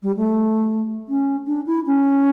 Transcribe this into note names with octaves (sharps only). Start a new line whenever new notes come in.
G3
A3
C#4
D4
E4
C#4